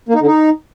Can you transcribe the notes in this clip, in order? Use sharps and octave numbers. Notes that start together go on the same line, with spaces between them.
A#3
D#4
D3
D#4